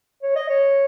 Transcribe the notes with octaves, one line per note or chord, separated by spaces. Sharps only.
C#5
D#5
C#5